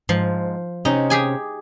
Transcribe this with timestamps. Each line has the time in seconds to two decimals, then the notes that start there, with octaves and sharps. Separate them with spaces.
0.09 G#2 F3
0.85 C3 C4 C#4 D#4
1.10 G4 G#4 G#5